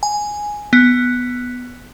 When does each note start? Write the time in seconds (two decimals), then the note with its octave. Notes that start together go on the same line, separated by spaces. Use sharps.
0.03 G#5
0.73 B3